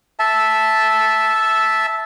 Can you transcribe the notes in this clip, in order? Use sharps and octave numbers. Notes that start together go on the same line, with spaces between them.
E5 A5